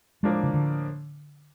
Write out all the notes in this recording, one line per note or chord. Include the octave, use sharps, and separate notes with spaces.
A2 F3 G#3 A#3 D4
C#3
D3